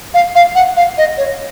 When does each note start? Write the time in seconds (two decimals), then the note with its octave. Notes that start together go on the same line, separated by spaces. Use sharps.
0.14 F5
0.35 F5
0.55 F#5
0.77 F5
0.98 D#5
1.18 C#5